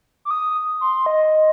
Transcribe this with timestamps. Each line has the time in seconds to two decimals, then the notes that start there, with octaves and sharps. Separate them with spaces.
0.25 D6
0.31 D#6
0.81 C6
1.06 D#5